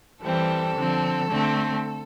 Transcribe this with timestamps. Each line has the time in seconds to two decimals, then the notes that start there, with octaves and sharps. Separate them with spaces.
0.22 E3 G3 C4 A4
0.76 D3 F3 C4
1.30 D3 A3 C4